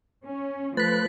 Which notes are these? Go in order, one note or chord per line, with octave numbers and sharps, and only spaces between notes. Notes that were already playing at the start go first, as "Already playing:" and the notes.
C#4
F3 A3 B4 F#6 A6 B6